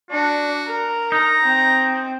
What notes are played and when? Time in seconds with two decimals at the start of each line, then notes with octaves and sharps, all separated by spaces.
0.11 D4 F#4
0.67 A#4
1.12 D#4 A#5
1.44 C4